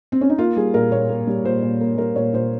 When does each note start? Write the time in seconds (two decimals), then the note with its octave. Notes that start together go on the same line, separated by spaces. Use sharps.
0.12 C4
0.21 C#4
0.29 D#4
0.38 A#3 F4
0.56 G3 G#4
0.74 A#2 A#4
0.92 A#2 C#5
1.09 A#3
1.27 G3
1.44 A#2 C5
1.62 A#2
1.81 A#3
1.97 G3 A#4
2.16 A#2 C#5
2.33 A#2 C5